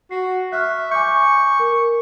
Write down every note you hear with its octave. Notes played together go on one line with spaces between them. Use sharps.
F#4 C7
E5 C#6 F6 F#6
G#5 C#6 D6 G6
A#4